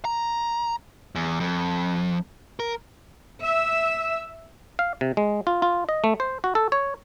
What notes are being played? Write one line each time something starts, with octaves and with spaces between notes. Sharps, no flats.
A#5
E2
F2
A#4
E5
F5
C3
G#3
F4
F4
D#5
A3
C5
F#4
A4
C#5